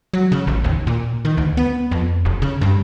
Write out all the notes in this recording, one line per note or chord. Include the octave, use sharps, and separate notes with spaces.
F#3
C#3
A1
D#2
A#2
D#3
D2
B3
F2
F1
C#3
G2